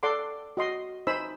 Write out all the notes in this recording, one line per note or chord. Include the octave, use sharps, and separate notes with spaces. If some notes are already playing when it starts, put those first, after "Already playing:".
A4 D5 F#5 C6 D6
F#4 D#5 C6
D#4 C5 G#5 B5 E6